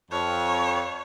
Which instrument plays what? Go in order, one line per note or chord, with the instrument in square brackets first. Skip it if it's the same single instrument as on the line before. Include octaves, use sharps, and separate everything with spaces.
[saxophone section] F2 [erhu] C#5